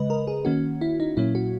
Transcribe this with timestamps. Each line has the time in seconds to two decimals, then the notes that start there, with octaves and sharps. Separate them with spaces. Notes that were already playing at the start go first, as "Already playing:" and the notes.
Already playing: C#3 G#3 B4 D#5
0.10 A#4
0.27 G#4
0.45 D#3 A#3 C#4 F#4
0.81 E4
1.00 D#4
1.17 A#2 F#3 A#3 C#4 E4
1.35 F#4